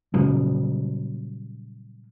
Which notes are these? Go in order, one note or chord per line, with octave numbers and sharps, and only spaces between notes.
A#2 C#3 F#3 G3